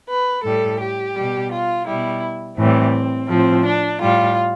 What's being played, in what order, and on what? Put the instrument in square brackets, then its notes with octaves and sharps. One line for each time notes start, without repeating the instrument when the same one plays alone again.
[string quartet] B4
A2 G3 A4
G4
B2 G3
F4
B2 G3 E4
A2 E3 G3 C4
A2 F3 C4
D4
A2 G3 F4